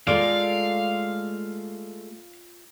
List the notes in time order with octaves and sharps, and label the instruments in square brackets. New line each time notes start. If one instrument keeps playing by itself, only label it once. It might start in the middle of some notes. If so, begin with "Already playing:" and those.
[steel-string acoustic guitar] G#3 A3 [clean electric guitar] F4 D5 [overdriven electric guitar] F5